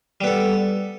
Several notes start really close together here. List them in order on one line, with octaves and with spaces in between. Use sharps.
G3 B3 A4